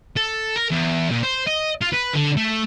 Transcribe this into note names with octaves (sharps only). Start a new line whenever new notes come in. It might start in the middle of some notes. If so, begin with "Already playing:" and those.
A4
A#4
E2
A#2
C5
D#5
F4
B4
D3
A3